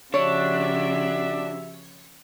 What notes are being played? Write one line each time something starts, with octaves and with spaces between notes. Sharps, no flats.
C#3 F3 D4 F#4 G4 C#5 E5